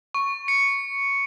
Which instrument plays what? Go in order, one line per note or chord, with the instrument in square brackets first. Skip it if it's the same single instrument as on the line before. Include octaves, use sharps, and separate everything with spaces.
[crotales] C#6
C#7